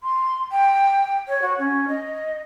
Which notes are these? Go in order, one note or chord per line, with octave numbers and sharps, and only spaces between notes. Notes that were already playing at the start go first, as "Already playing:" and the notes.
C6
G5
C#5
F#4
C#4
D#5